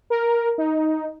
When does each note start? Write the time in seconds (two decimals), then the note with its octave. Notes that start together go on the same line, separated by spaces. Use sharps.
0.10 A#4
0.58 D#4